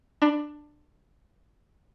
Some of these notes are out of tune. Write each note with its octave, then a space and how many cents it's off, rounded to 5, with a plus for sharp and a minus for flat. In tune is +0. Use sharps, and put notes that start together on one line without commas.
D4 +15 B5 +0